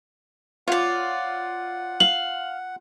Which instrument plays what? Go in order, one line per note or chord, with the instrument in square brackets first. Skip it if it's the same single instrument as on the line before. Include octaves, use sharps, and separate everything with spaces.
[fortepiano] F4 [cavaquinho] C#5 D5 [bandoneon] F#5
[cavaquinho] F5 [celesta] F#7